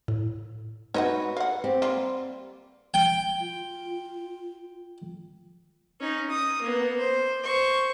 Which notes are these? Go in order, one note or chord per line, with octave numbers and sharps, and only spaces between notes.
A2
D#4 F#4 B4 C#5 D#5 F#5
F5 F#5
C4 G4
G3 A#3 F4
G5
F4
C#4 D#4
D#6
A#3 B3
C5
C5 C#6